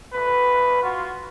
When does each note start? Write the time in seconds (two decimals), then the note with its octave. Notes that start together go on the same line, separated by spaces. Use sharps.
0.13 D2 B4
0.82 F4 F#4